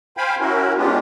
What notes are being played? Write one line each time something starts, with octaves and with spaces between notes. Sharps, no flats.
C5 F5 G5 G#5 B5
C#4 E4 F#4 A#4
G#3 B3 C#4 D4 F4 G4